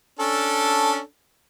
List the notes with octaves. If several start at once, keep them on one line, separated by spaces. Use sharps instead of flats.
C#4 D4 A4